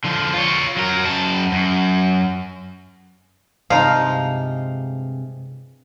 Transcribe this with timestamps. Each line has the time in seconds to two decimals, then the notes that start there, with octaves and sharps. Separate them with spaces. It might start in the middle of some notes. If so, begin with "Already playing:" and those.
0.04 D3 F3
0.34 F4 C#5
0.77 F#3 A#4
1.04 F#2 A5
1.52 F#2
3.70 G2 C3 F3 G#3 D#4 F5